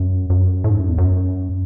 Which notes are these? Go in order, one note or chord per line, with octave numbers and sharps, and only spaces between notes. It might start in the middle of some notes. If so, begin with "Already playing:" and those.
Already playing: F#2
F#2
A2
G#2
F#2
E2
F#2